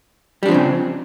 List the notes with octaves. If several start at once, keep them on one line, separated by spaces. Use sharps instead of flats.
C#3 F3 G3 C4 D4